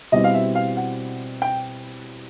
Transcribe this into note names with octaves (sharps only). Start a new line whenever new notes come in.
B2 G3 C4 E4 D#5
F5
E5
F5
F#5
G5